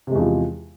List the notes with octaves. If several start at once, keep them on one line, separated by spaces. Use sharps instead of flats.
E2 C3 F3 G#3